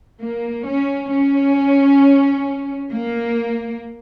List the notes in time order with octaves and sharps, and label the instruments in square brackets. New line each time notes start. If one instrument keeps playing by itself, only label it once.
[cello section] A#3
C#4
C#4
A#3